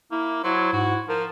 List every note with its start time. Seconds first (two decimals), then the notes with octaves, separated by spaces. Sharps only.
0.12 A#3 E4
0.44 F#3 E4 C5
0.73 G#2 F#4
1.09 F3 A#4